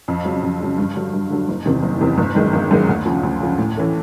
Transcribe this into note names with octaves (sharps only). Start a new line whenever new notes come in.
F2
C#3 F#3
F2
C#3 F#3
G2
D3 F#3
G2
D3 F#3
F#1
E2 C3 D#3
F#1
E2 C3 D#3
G1
F#2 D#3 G#3
G1
F#2 D#3 G#3
D2
C#3 F3
D2
C#3 F3
A2
E3 A3 C#4